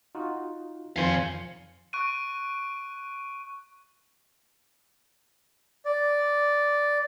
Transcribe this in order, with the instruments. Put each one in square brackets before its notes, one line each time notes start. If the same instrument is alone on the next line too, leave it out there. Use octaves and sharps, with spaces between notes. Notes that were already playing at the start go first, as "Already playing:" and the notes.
[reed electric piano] D#4 F4 F#4
[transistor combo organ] F2 [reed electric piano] D#3 C4 C5 [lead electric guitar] F5 G#5
[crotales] C#6 F#6 D7 D#7
[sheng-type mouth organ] D5